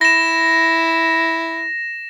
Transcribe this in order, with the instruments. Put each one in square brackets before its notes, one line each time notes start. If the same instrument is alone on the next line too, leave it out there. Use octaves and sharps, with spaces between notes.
[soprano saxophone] E4 [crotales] A#6 E7